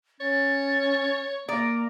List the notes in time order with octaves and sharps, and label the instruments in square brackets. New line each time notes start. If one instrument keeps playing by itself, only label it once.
[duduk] C#4 [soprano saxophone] C#5 [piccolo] A6
[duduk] A#3 [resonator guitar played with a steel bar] D5 [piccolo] A#5